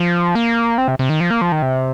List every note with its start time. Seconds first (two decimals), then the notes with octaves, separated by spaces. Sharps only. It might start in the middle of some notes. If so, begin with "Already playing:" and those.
Already playing: F3
0.35 A#3
0.78 C4
0.88 C3
0.99 C3
1.09 D#3
1.20 F3
1.30 A#3
1.42 F3
1.52 D#3
1.62 C3